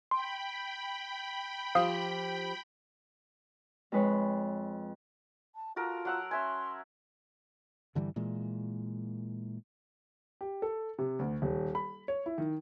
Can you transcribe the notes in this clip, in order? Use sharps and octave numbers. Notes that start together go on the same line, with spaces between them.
G5 B5 C6
F3 G4 C5 F5 D#6
F2 G#3 B4 C#5
A5
F4 F#4 A4 A#4
F#3 F#5 E6
C#4 E5 G#5 C6
G2 D3 E3 G3
A#2 E3 G#3
G4
A4
C3
D2
D#1
B5
C#5
E4
D#3